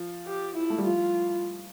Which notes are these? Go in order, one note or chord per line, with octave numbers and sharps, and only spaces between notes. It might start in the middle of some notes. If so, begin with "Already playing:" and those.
Already playing: F3
G4
E4
A3
G3
F3 F4